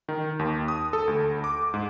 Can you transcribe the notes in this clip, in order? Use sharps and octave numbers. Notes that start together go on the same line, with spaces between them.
D#3
D#2
D#6
A4
D2
D6
G#2